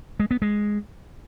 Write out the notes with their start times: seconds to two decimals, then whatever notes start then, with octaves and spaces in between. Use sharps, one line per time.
0.20 G#3
0.31 B3
0.42 G#3